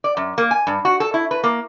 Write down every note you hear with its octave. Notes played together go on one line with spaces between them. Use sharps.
D5
F#2
A#3
G#5
G2
F#4
A4
E4
B4
A#3